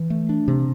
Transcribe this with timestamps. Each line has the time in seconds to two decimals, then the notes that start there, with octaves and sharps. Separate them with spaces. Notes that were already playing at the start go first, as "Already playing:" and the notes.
Already playing: E3
0.10 A3
0.29 D4
0.48 C3